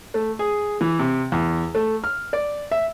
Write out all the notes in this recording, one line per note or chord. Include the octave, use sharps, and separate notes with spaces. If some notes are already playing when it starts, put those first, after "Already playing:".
A3
G#4
E3
C3
E2
A3
F6
D5
E5